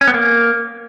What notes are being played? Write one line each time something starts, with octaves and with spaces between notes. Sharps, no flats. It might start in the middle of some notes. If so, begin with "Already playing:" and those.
C#4
B3
A#3